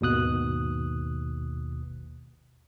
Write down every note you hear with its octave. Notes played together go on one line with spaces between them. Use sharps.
G#1 D#2 B2 D#6 F#6